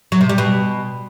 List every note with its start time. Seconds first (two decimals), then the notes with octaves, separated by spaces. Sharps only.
0.12 F#3
0.21 C3
0.29 G3
0.38 B2